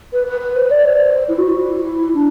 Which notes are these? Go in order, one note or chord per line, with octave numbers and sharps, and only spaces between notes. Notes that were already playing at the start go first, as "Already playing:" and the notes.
B4
B4
B4
C5
D5
C5
E4
F#4
E4
D4